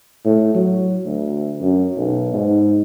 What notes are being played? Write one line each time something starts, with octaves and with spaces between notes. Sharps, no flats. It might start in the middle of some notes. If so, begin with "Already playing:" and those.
A2
F#3
D2
F#2
B1
G#2